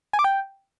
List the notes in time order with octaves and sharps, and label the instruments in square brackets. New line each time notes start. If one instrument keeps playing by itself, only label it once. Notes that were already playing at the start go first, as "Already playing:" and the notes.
[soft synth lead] G#5
D6
G5